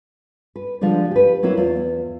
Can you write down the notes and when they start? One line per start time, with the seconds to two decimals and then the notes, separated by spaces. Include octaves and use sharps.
0.56 B4
0.81 D3 F3 G3 G#3 D4
1.11 G4 B4
1.43 F#3 A#3 C4 E4
1.57 E2 F4